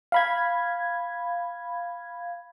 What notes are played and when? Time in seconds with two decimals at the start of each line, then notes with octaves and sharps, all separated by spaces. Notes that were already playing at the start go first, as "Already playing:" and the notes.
0.12 F5 B5 G#6